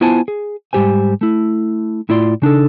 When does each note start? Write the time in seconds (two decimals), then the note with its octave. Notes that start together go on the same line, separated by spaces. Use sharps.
0.01 B3 E4 F4 C5 G#5 A5
0.28 G#4
0.73 G#2 G3 G4 C5 G#5
1.21 A3 E4
2.09 A2 E4 F4 D5 C6
2.42 C#3 D4 D#4 A4